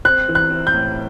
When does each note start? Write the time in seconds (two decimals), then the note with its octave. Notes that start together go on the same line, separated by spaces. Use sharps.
0.05 C4 F#6
0.28 E3
0.35 F#6
0.51 C4
0.67 G6
0.74 A2